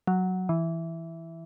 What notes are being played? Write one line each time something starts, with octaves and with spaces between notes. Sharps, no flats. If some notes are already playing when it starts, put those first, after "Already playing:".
F#3
E3